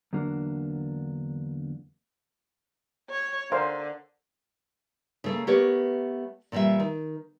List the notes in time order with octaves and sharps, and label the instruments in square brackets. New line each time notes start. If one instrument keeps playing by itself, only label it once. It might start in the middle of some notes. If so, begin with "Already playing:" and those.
[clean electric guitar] E2 D3 F#3 A#3 D4
[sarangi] C#5
[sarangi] D3 [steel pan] A#4 C5 F5
[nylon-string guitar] C#3 A3 A#3
A3 B3 G4 A#4 C#5
A#2 E3 G3 F4 E5
D#3